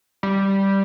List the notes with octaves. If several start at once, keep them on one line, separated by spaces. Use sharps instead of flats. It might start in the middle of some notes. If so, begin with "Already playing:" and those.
G3